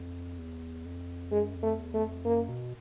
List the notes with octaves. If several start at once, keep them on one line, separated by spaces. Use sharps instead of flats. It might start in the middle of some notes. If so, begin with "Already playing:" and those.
Already playing: F2
E2
F2
F#2 G#3
F2
A3
E2
A3
F2
F#2 A#3
B2